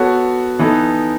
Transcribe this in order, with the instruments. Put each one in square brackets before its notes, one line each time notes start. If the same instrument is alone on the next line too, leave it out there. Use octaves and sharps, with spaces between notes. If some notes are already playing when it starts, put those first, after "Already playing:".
Already playing: [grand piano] B3 F#4 A4 C#5
E3 B3 D#4 A4